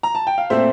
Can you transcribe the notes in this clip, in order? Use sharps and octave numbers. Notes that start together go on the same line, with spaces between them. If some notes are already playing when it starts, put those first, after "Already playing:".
A#5
A5
G5
F5
A#2 A3 C4 C5 E5